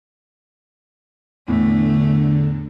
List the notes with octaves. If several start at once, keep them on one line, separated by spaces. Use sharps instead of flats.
E2 A2 D3 A3